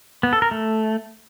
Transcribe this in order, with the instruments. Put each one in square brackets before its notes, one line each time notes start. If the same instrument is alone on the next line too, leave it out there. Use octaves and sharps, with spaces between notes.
[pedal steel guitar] B3
A4
A#4
A3